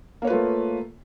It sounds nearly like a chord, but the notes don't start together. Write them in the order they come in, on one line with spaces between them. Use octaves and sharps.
A#3 C#5 B4 F4 A3